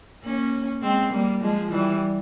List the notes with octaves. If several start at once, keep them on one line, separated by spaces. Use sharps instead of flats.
A#3 C#4
G#3 C4
G3 A#3
F3 G#3
E3 G3